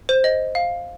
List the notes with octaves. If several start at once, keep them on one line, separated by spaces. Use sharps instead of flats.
C5
D#5
F5